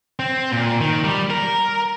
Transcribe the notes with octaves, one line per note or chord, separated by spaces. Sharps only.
C4
A#2
D#3
G3
A#4